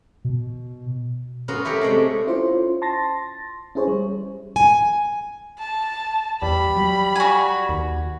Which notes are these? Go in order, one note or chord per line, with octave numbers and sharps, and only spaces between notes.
B2
B3 C#4 F4 F#4 A#4
E4 G4 A4 A#4
C3 G#3 A3 D5
C#4 E4 F4 C5
A5 C6 A6 A#6
C#4 E4 G#4 C5 C#5
G3
G#5
A5
E2 G3 B5
F#3
F#4 G#5
D#2